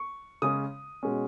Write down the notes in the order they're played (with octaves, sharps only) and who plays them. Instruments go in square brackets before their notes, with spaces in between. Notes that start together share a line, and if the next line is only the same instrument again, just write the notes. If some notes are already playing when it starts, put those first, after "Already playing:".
Already playing: [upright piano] C#6
C#3 G#3 C#4 D#6
B2 G#3 C#4